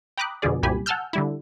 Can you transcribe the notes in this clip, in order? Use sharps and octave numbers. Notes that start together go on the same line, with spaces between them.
G5 A#5 B5 D6 D#6 F#6
F2 B2 D3 F3 G#4 D5
C2 F#2 A#2 G4 G#5 B5
F#5 G#5 A5 E6 F6 G6
D3 G3 E4